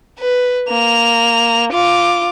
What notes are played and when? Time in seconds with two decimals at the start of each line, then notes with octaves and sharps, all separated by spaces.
0.19 B4
0.68 A#3 F7
1.72 F4 D6